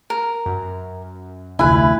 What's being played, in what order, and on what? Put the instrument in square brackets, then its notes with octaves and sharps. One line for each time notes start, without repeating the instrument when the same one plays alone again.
[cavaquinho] A#4
[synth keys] F#2
[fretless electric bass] F1 D2 [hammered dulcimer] E4 [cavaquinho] B4 G#5